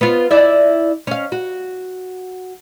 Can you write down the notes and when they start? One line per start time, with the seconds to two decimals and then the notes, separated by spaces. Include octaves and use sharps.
0.01 B3 F4
0.31 E4 D5 E5
1.07 C#4 F5
1.32 F#4